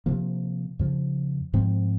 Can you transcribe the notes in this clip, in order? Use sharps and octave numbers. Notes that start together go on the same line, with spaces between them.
C3 F3 A#3
F2 C#3 F3
G#2 F3 C4